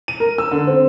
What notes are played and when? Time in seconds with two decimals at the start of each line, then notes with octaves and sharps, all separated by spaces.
0.08 D#7
0.20 A#4
0.38 E6
0.51 D3
0.67 C4